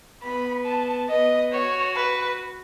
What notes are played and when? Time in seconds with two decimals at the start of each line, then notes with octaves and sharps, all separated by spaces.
0.23 B3 B5
0.65 A5
1.09 B3 D#5
1.52 F#4 C#5
1.95 B4